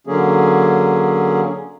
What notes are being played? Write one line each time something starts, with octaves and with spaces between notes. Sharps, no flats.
D3 F#3 A#3 C#4 G#4